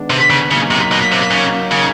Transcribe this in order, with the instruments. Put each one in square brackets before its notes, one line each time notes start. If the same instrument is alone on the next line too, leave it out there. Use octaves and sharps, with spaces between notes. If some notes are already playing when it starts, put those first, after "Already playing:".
Already playing: [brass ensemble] D#3 G#3 B3 D4
[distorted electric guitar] C3
C#3
[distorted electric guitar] C#3 [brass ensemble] F#3 A#3 D#4
[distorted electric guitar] C3
B2
C3
C#3
C#3